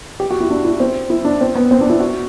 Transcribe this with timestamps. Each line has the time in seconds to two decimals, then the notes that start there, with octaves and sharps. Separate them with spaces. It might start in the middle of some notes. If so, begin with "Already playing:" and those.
0.20 G4
0.31 F#4
0.40 E4
0.50 D4
0.65 E4
0.80 C4
1.10 E4
1.25 D4
1.41 C4
1.55 B3
1.71 C4
1.81 D4
1.90 E4
2.00 F#4